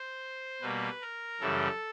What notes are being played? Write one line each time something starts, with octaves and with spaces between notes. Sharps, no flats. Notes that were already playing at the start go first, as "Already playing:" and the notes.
Already playing: C5
B2 G3 A#3 B4
A#4
F#2 C#3 E3 G3 A4